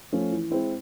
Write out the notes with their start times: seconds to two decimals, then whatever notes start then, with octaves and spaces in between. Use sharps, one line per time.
0.13 F3 A3 C#4
0.31 E3
0.51 G#3 C4 E4